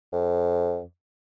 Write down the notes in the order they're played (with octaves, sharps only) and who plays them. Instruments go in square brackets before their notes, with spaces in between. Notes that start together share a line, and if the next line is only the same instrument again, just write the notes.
[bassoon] F2